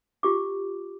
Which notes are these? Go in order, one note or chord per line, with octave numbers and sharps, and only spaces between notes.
F4 G4 D6